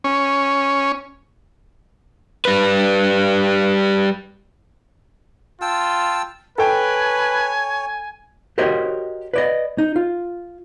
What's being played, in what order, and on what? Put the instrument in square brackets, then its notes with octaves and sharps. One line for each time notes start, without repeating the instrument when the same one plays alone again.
[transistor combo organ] C#4
[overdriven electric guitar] G3 B4
[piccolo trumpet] F4 [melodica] G5 A5 E6
[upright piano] A4 G5 [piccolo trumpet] B4 [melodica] C#5 [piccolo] G#5
[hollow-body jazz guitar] F#4 G4 A#4 C5 C#5 D#5
B4 D5 D#5
D#4
F4